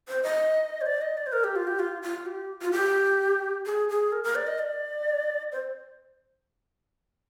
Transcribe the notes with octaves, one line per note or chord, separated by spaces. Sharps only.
C5
D#5
C5
D5
D#5
D5
C5
A#4
G4
F4
G4
F4
F4
G4
F4
G4
G#4
G#4
A#4
A#4
D5
D#5
D5
C5